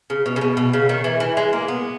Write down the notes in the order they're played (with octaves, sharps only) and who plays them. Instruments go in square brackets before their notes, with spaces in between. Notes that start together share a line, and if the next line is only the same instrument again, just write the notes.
[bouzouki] C#3
B2
C#3
B2
B2
C#3
D#3
E3
E3
G#3
A#3
B3